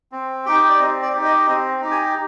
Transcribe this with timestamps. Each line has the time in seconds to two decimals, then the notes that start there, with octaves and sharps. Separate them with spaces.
0.12 C4
0.46 D#4 G4 G5
0.70 D5
0.79 C4 D#5
1.02 D5
1.13 D#4 G4
1.25 D#5
1.47 C4 D#5
1.81 D#4 G4
1.91 G#5